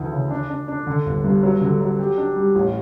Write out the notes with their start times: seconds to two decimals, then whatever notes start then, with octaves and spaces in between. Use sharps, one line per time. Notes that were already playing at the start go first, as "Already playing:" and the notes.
Already playing: D2 D3 E3
0.13 C#3
0.31 D4
0.50 D4
0.68 D4
0.87 D3
1.06 G1
1.24 G2
1.43 F#3
1.61 D3
1.81 F#3
1.99 G4
2.18 D4
2.36 G3
2.55 A1